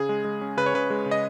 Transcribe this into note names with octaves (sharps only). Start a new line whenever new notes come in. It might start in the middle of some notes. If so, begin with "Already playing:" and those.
Already playing: C#3 G#4
G#3
G#3
C#4
C#3 B4
C#5
C#3 B4
G#3
C#3
D#5